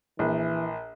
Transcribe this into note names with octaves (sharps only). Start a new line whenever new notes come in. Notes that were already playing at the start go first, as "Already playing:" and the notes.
A#1 E3